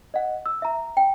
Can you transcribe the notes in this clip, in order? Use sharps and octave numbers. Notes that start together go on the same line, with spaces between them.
D#5 F#5
E6
E5 A#5
G5